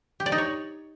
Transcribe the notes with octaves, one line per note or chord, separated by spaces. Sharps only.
G4
D5
D#4
C#5